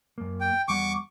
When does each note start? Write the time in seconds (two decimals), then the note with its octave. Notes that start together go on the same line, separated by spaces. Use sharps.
0.18 F#2 A#3
0.41 G5
0.68 E2 G3 F#5 C#6 D6